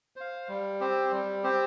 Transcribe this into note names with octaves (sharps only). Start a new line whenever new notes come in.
C5 F5
G3
C4 G4 C5
G3
C4 G4 C5